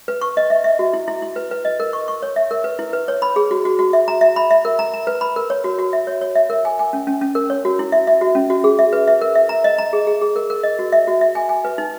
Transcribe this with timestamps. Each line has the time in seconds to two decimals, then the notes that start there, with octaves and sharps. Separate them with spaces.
0.08 B4
0.21 C#6
0.37 D#5
0.50 E5
0.64 E5
0.79 F#4
0.93 E4
1.08 E4
1.22 E4
1.36 B4
1.51 B4
1.65 D#5
1.80 A#4
1.93 C#6
2.08 C#6
2.22 C#5
2.36 E5
2.51 A#4
2.64 B4
2.79 E4
2.93 B4
3.08 C#5
3.22 B5
3.36 G#4
3.51 F#4
3.65 F#4
3.79 F#4
3.93 E5
4.08 A#5
4.21 E5
4.36 B5
4.51 E5
4.65 A#4
4.79 A#5
4.93 A#5
5.07 B4
5.21 B5
5.36 A#4
5.50 C#5
5.64 F#4
5.79 F#4
5.93 E5
6.07 C#5
6.21 C#5
6.36 E5
6.50 A#4
6.65 G#5
6.79 G#5
6.93 C#4
7.07 C#4
7.22 C#4
7.35 A#4
7.50 C#5
7.65 F#4
7.79 E4
7.92 E5
8.07 E5
8.21 F#4
8.35 C#4
8.50 F#4
8.64 G#4
8.79 E5
8.93 B4
9.07 E5
9.21 A#4
9.35 E5
9.49 A#5
9.64 D#5
9.78 A#5
9.93 G#4
10.07 G#4
10.21 G#4
10.36 A#4
10.50 A#4
10.63 D#5
10.79 F#4
10.92 E5
11.07 F#4
11.21 E5
11.35 G#5
11.49 G#5
11.65 B4
11.78 D#4